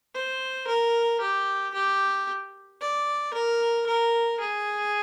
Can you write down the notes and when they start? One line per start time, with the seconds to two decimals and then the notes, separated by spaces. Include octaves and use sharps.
0.14 C5
0.67 A#4
1.21 G4
1.74 G4
2.81 D5
3.34 A#4
3.87 A#4
4.40 G#4